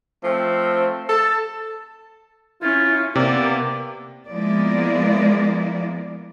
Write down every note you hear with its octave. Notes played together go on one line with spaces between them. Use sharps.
F3 A3 C4
A4 A5
C#4 E4 F4
C3 A#3 B3 D5
F3 G#3 A#3 B3 E4 D5